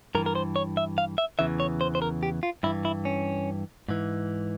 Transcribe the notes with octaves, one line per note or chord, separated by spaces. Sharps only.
G2 E3 A#4
A#4
C5
C#5
E5
F5
E5
E2 C#3 E3 E5
C#5
C5
C5
A#4
G4
F4
G2 E3 E4
E4
C#4
G#2 E3